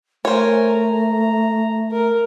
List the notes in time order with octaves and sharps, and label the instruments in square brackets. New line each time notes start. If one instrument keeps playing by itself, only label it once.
[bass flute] A3 [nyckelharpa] A#4 G#5 [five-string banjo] C5 C#5
[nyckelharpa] A#5
A#4